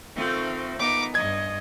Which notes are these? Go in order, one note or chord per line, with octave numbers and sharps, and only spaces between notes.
D#3 A3 C4 F4
B3 D#4 D6
G2 D#5 G#6